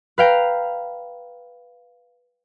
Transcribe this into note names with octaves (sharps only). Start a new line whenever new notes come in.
B4 F5 G5 A#5